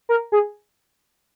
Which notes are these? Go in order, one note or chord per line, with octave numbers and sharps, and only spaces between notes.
A#4
G#4